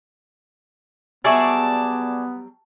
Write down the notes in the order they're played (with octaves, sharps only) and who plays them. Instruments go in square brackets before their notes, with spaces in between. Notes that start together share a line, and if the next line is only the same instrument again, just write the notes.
[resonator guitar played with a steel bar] F#3 G3 E5 [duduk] B3 [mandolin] G#4 D5 C#6 [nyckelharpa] A5